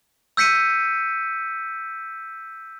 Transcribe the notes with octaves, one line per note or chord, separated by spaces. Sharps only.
E6 G6 B6 C#7 D#7